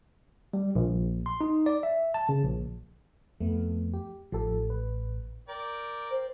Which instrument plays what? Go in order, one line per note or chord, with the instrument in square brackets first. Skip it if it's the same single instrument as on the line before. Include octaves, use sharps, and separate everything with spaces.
[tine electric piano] G3
A#1
C6
D#4
D5
E5
A5
C#3
A#1
[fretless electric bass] F2 [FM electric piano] A3 B3
[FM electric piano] G4
[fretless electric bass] A1 [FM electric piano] F3 G4 A4
[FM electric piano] B4
[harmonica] A#4 D5 G5
[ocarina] C5